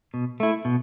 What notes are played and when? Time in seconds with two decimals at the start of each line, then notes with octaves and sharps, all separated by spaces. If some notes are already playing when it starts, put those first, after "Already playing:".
0.14 B2
0.40 A3 E4
0.65 B2